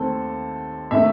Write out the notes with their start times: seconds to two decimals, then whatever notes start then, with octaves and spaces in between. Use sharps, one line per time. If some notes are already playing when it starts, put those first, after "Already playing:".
Already playing: D#2 D#3 A3 C4 A4
0.91 C3 D#3 A3 E5